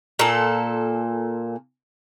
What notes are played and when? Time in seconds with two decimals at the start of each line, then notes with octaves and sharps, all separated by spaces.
0.19 A#2 A4